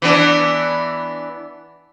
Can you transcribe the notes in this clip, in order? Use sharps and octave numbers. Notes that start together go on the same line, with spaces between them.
E3 B3 D4